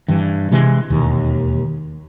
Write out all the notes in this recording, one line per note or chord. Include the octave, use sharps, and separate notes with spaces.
G2 E3
C3 E3 G#3
E1 D#2